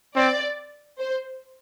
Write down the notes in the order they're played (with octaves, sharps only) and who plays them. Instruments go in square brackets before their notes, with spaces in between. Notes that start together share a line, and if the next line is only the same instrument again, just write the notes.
[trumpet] C4 [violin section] D5
[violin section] C5